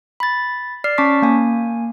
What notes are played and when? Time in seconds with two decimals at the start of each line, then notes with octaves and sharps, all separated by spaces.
0.20 B5 A6
0.84 D5 F6 C7
0.98 C#4 A5 C#6 D6 B6
1.22 A#3 G#5